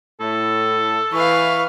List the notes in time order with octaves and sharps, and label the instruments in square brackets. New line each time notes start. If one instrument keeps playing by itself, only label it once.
[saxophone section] A2 [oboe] A4
[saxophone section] E3 [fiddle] B4 F5 [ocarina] C#6